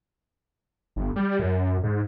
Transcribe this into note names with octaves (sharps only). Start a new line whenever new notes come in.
G1
G3
F#2
G#2